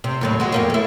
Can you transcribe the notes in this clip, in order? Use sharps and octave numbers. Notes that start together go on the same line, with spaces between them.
C3
D#2 A2 F#3
G#3 F#4
F2 A#3 C#4
A3 E4